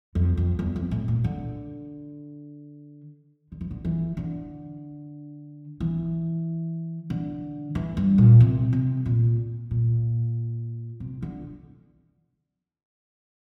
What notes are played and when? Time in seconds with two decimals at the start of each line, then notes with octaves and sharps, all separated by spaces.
0.15 F2
0.37 F2
0.59 E2
0.76 F2
0.91 A2
1.08 A#2
1.24 D3
3.52 D3
3.61 E3
3.71 D3
3.85 E3
4.17 D3
5.80 E3
7.10 D3
7.75 E3
7.97 G2
8.18 A#2
8.40 C3
8.73 C3
9.06 A#2
9.71 A#2
11.00 C3
11.22 D3